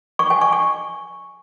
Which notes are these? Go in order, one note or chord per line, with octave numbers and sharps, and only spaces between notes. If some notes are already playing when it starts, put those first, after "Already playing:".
C#6
G#5
C#6
C#6